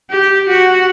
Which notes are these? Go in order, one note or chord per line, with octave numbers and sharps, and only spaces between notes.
G4
F#4